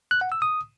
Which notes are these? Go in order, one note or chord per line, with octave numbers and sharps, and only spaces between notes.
F#6
F#5
E6
D#6